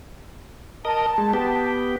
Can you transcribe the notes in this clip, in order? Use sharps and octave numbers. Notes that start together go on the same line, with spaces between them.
A#4 D#5 A5
G#3
B3 G4